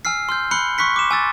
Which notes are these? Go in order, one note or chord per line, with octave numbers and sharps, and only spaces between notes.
G#5 E6 F6 C7
C6 F6 G6
B5 F#6 C#7 G7
C6 C#6 F#6 B6 C#7
D6 E7
G#5 E6 A6